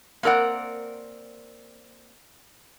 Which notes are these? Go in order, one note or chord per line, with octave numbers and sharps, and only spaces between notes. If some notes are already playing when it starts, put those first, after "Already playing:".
A#3 C4 A#4 D5 F#5